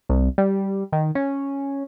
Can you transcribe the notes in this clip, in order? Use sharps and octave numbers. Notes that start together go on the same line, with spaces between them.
C2
G3
D#3
C#4